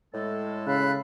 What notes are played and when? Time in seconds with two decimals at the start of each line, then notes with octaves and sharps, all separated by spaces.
0.13 A2 G#3 A4
0.67 C#3 F5 B5 F#6